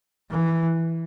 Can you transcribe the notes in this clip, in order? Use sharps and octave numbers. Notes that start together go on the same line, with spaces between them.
E3